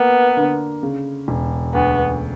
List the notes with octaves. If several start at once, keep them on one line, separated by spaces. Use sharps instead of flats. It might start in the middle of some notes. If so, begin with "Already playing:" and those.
Already playing: A#3 B3
D3
C#3
E1
D2 B3